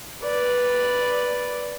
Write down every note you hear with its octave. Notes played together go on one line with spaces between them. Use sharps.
B4 D5